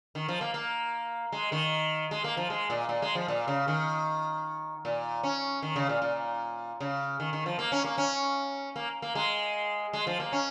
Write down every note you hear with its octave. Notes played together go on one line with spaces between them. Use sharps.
D#3
F3
A#3
A#3
G#3
D#3
G#3
A#3
F3
G#3
A#2
A#2
G#3
F3
A#2
C#3
D#3
A#2
C#4
D#3
C#3
A#2
A#2
C#3
D#3
D#3
F3
A#3
C#4
A#3
C#4
A#3
A#3
G#3
G#3
F3
A#3
C#4